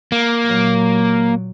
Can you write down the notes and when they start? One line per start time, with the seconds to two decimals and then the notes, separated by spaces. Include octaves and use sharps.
0.12 A#3
0.46 A#2 F#3